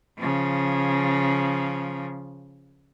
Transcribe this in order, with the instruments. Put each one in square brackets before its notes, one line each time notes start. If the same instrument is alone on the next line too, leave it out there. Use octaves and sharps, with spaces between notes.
[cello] C#3 F3